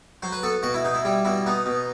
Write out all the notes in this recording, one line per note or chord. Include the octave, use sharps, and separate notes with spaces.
F#3 C5
B4
B3 A4
B2 F#4
E4
B2 D#4
E4
G3 E4
B2 E4
B3 D#4
B2